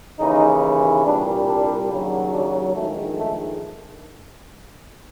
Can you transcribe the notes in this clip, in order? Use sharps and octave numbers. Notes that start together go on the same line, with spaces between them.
D#2 C#3 E3 D#4
C2 A#2 G3 D4
D4
D#2 C#3 F#3
D4
A#1 G#2 D#3 G#3 A3
A3